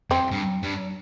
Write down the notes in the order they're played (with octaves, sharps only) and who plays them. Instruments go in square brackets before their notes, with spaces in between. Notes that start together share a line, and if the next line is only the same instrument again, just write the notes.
[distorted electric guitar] F2 [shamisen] C4
[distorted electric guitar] G2
G2